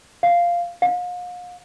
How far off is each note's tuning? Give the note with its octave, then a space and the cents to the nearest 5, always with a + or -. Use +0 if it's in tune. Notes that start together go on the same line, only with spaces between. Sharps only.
F5 -5
F5 +40